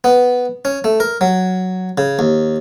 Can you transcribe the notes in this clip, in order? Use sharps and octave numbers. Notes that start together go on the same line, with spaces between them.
B3
C#4
A3
A#4
F#3
C#3
D#2